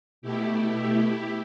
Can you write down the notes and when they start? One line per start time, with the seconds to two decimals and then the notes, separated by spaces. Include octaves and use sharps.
0.22 B2 A3 E4 G4